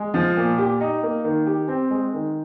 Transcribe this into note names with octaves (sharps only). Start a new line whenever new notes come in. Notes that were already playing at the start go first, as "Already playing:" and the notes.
Already playing: G#3
F3
A#2
G4
D#4
A#3
D#3
G4
C4
G#3
D#3